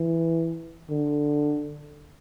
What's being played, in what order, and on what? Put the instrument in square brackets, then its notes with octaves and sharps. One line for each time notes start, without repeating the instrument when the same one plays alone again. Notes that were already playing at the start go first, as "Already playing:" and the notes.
Already playing: [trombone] E3
D3